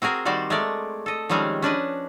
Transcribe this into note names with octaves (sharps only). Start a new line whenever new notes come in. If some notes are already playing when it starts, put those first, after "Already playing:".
C4 F#4 G#4 A#4
D#3 G3 F#4 C5 D5
G#3 A3 A#4 D5
A4 D#5
D#3 F3 G3 G#3 C4 C#4
C#4 D4 B4 D#5